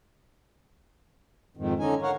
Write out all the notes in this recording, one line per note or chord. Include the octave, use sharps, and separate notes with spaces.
F2 G#2 D#3
D3 C#4 D#4 G#5
A#4 C#5 F5 F#5